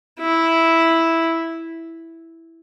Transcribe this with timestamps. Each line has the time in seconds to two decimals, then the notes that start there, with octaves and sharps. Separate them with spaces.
0.20 E4